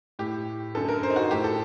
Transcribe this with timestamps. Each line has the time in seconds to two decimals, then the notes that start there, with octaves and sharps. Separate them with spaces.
0.19 A2 G4
0.75 F#2 D3 A4
0.88 A#4
1.03 C5
1.10 D#4
1.16 F#4
1.31 A2 G4
1.44 A4